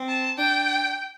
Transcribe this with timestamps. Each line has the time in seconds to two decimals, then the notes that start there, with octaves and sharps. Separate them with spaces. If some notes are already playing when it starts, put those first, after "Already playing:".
Already playing: C4
0.09 A5
0.38 D4 G5